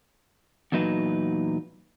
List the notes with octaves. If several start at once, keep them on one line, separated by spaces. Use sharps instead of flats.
E2 A#2 F#3 D#4 B4